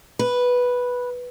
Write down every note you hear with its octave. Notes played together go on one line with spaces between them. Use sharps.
B4